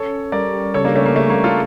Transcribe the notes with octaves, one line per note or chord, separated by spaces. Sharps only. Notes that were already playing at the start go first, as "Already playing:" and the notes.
Already playing: C#4 A4 C#5
C#4
G3 A#4 D5
G3
C#3 A4 C#5
A#3 D4
C#3 A3 C#4
A#3
C#3 A3
A#3
C#3
F4 A4